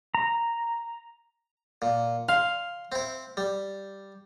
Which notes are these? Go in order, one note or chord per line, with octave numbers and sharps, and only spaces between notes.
A#5
A#2
F5 C6
C4 E4
G3